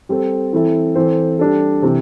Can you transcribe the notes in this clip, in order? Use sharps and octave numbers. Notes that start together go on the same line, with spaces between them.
G3 C4 A4 C5
E3 C4 E4 A4
E3 C4 A4 C5
G3 D4 A4
C3 E3 C4